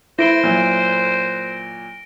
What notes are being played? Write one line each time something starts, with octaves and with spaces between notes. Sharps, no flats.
E4 C5 A#6 D7 G7
A#2 F#3